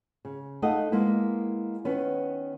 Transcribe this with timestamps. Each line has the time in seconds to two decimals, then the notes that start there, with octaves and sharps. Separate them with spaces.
0.25 C#3
0.62 A3 D#4 A4 D#5 F5 F#5
0.92 G#3 A#3 B3 E4
1.85 D#3 B3 C#4 B4